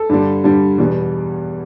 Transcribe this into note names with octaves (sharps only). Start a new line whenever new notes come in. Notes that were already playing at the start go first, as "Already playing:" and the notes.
Already playing: A4
G2 D3 G3
G2 D3 G3
E2 B2 G3